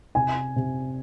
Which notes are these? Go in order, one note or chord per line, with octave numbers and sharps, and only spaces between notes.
C3 G#5
C3